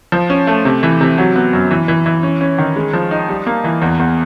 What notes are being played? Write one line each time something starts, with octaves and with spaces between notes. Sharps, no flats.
F3
C#4
A3
C3
E3
C3
F#3
B3
F#2
E3
E3
E3
C#4
C#4
D#3
G#3
F3
D#4
G3
A#3
E3
E2
E2